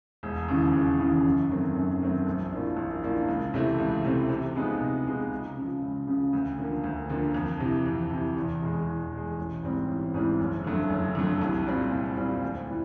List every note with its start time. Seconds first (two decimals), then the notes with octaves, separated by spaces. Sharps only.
0.23 E1
0.49 D#2 C#3 E3
0.74 E1
0.99 D#2 C#3 E3
1.25 F#2
1.50 D#3 F#3 A3 C4
1.76 F#2
2.01 D#3 F#3 A3 C4
2.27 A#1
2.52 A2 F3 A#3 D4
2.77 A#1
3.03 A2 F3 A#3 D4
3.28 C#2
3.54 C3 E3 A3 C4
3.78 C#2
4.04 C3 E3 A3 C4
4.29 C3
4.54 F3 G#3 B3 D#4
4.81 C3
5.05 F3 G#3 B3 D#4
5.31 C#2
5.56 C#3 F3
5.82 C#2
6.07 C#3 F3
6.33 D2
6.58 D3 F3 A#3
6.84 D2
7.09 D3 F3 A#3
7.34 F2
7.60 C3 E3
7.86 F2
8.11 C3 E3
8.37 E2
8.62 B2 G#3
8.87 E2
9.13 B2 G#3
9.38 A1
9.63 G#2 E3 G3 C4
9.88 A1
10.14 G#2 E3 G3 C4
10.40 F#1
10.64 F2 D3 F#3 A3
10.90 F#1
11.15 F2 D3 F#3 A3
11.42 C2
11.67 A#2 G3 C4
11.92 C2
12.17 A#2 G3 C4
12.42 D2
12.69 E3 G3